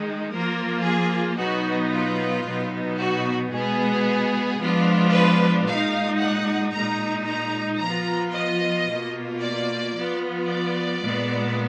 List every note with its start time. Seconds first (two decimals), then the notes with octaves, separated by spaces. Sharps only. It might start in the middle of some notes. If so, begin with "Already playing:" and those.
Already playing: D#3 G#3 D#4
0.32 F3 A#3 F4 A#4
0.85 G#4
1.39 B2 F#3 B3 D#4 F#4
1.93 F4
2.46 B2 F#3 B3 D#4
3.00 F#4
3.53 B2 G#3 B3 G#4
4.60 F3 G#3 B3 D4 F4
5.14 B4
5.67 A#2 G#3 D#4 F5
6.21 F#5
6.74 A#2 G#3 D#4 A#5
7.28 A#5
7.81 F3 B3 F4 A#5
8.35 D#5
8.89 B2 A#3 F4
9.42 D5
9.95 F3 B3 F4
10.49 D5
11.02 A#2 G#3 B3